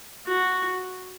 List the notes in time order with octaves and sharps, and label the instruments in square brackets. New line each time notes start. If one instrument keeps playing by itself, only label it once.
[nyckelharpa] F#4